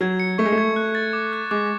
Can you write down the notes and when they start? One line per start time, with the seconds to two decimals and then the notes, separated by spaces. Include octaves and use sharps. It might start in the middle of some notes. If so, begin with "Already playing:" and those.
0.01 F#3 G#6
0.20 C#7
0.38 A3 C#6
0.45 G#3
0.52 A3
0.58 G#6
0.76 F#6
0.95 A6
1.13 D6
1.33 F#6
1.51 G#3 D6